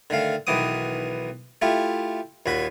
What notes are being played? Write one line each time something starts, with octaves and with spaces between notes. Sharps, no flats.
D3 D#3 A3 F5
B1 D#3 E3 B3 D6 D#6
A3 E4 F4 G4
D#2 A#2 F#4 B5